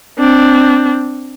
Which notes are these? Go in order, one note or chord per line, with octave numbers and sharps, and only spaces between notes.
C4 D4